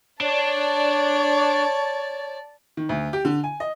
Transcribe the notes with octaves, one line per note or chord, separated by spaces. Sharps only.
D4 C#5 D5 A5
D#3
D2
G4
D3
G#5
D#5